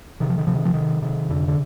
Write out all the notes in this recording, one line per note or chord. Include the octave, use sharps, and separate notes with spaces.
C3 D#3
F3
D#3
C3 F3
D#3
F3
C3 D#3
C3 D#3
F2 D3
D3